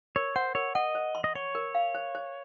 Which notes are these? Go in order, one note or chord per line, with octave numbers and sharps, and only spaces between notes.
A#4 C#5
C5 F#5
A#4 C#5
D#5 F#5
C5
C6
D#5
C#5 C#6
A#4
F5
C5
C5